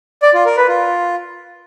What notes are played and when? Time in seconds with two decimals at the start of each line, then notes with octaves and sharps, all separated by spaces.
0.23 D5
0.34 F4
0.45 A#4
0.57 B4
0.68 F4